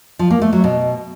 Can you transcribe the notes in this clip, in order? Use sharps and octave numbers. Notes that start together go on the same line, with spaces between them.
F3
A#3
A3
F#3
B2